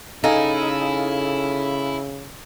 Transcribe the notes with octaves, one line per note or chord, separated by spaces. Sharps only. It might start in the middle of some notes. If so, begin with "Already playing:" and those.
C#3 D#4 E4 A4 F5 G#5